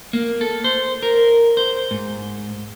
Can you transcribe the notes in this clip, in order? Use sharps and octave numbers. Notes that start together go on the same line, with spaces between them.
A#3
A4
C5
A#4
C5
G#2